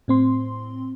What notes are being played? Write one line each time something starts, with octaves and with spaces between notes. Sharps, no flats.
A2 C4 C6